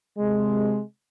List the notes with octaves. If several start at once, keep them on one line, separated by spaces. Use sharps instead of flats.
C3 G#3